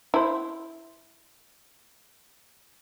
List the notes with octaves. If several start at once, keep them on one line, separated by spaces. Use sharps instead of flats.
E4 C5